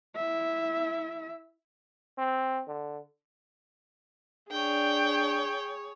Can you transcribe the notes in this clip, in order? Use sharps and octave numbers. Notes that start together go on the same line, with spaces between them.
E4 E5
C4
D3
D4 G#4 C#5 G5